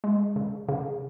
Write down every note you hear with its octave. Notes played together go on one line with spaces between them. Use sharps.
G#3
C#3
C#3